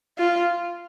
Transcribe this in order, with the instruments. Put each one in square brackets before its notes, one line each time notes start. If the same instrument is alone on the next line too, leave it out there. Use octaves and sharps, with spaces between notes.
[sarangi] F4